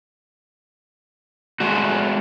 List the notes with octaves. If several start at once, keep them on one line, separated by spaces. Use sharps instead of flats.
G#3 A3 F#4